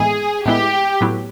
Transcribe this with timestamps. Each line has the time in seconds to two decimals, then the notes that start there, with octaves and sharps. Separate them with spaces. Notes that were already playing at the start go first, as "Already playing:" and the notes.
Already playing: A2 E3 G#3 B3 E4 G#4
0.46 A2 E3 G#3 B3 E4 G4
1.01 A2 F#3 B3 E4